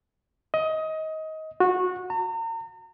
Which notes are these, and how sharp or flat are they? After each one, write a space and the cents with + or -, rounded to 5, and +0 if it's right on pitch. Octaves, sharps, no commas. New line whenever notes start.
D#5 +20
F#4 -20
A#5 -40